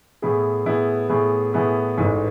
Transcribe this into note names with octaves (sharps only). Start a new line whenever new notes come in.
A2 E3 B3 E4 G#4
A2 E3 B3 E4 G#4
A2 E3 B3 E4 G#4
A2 E3 B3 E4 G#4
A1 G#2 E3 A3